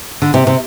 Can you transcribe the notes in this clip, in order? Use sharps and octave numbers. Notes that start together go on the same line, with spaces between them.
D3
C3
C3